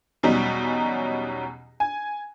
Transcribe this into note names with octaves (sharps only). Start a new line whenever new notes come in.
E2 B2 F#3 G3 C#4 D#4
G#5